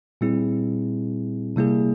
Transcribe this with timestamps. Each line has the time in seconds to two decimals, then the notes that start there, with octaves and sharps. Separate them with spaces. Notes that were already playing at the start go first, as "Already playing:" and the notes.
0.21 A#2 G3 C4 E4 G#4
1.56 C3 G3 A#3 E4 G#4